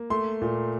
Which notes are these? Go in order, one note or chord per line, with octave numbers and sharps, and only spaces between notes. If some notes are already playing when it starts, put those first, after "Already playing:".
Already playing: A#3
A3 C6
A#2